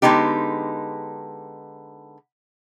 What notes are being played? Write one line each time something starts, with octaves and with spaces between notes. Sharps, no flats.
D3 G#3 B3 D#4 G4